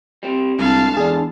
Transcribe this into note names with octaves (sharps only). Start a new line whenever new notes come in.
G3 C4
C2 G#2 D3 F5 A5
E2 D4 G#4